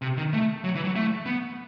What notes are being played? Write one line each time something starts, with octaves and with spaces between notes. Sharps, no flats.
C3
D#3
A3
F#3
E3
F#3
A3
B3